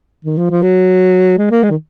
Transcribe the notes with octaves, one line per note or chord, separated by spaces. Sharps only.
D#3
F3
F3
F#3
G#3
A#3
G#3
D#3